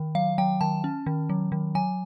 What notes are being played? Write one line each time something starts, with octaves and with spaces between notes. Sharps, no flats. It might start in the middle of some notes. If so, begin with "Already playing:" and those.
Already playing: D#3
F#3 F5
F#3 G5
D#3 A5
C#4
D#3
F#3
D#3
F#3 G#5